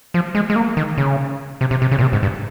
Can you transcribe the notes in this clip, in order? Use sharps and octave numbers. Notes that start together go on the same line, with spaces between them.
F3
G#3
G#3
A#3
D#3
C#3
C3
C3
C3
C#3
A#2
C3
G#2
G2